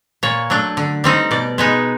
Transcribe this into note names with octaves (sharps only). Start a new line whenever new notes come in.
A#2 C#5
F#3 A3 D4
D3
G3 C4 D#4
B2 D5
G#3 B3 D#4